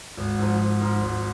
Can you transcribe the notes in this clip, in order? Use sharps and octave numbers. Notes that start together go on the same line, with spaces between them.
G#1
G#2 F3
G#1
G#2 F3
G#1